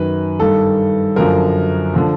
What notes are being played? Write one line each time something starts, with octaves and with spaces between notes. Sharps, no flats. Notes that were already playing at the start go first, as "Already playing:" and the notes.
Already playing: F#2 D#3 B4
G2 D#3 A4
F#2 D3 F3 A#4
D3 F3